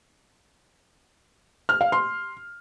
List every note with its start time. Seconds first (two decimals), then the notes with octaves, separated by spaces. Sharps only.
1.69 F6
1.81 F5
1.92 C6